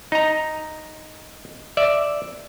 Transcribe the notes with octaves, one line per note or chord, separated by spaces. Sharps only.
D#4 A#5
D5 E5